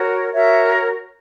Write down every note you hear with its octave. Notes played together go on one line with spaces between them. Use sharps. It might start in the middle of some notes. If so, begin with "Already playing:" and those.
Already playing: F#4 A#4 C#5
F#4 A#4 C#5 E5